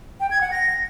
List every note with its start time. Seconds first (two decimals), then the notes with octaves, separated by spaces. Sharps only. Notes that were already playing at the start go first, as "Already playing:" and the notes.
0.20 G5
0.31 G#6
0.41 F#5
0.52 A#6